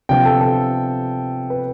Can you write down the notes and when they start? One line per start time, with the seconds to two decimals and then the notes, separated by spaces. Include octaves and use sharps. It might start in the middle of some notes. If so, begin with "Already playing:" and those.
0.09 C3 F3 B3 D4 F4 G5
0.25 A4
0.41 A4
1.50 B4